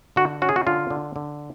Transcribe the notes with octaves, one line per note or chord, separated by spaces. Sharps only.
D3 F#4
C#4 F#4
G#4
F#4
D3 F4
D3
D3